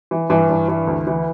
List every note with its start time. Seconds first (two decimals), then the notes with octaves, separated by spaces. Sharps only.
0.11 E3
0.30 G2 E3
0.49 G2
0.68 E3
0.87 D2
1.07 E3